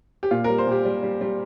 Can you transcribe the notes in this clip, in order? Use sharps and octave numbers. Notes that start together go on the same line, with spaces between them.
G4
A#2 F4
G3 A#4
C5
A#2 G4
G3
G3
G3